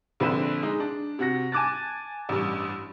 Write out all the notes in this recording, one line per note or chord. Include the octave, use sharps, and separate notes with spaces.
A#1 D3 C4 B4 E7
G#3 D#4
D4
C3 F#4 A#6
G#5 A5 D6 F#6 A6
A1 G2